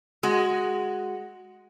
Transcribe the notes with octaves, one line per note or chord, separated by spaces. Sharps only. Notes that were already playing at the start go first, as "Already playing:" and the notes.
G#3 F#4